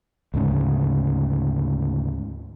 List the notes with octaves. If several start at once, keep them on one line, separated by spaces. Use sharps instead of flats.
D2 G#2 C#3